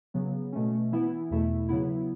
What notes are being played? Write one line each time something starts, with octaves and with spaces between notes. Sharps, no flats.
C#3 F#3 B3
B2 A3 C#4
E3 B3 E4
E2 B2 A3 E4
C#3 F#3 B3 E4